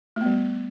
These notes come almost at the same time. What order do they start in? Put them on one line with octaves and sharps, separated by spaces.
A3 B3 G3